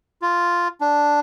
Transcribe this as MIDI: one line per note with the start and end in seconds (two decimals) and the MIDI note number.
0.22 0.68 65
0.81 1.20 62